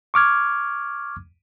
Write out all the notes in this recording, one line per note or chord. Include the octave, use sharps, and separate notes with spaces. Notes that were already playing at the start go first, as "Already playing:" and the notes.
C#6 D6 F6 G#6